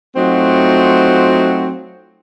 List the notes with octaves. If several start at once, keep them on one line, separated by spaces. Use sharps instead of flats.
F#3 A3 C4 D#4 F4 F#4